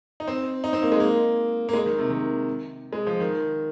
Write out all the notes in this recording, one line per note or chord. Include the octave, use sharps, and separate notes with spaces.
D#4
C4
D#4
C4
A#3
G#3
A#3
A#3
G#3
D#3
C3
D#3
G#3
F3
D#3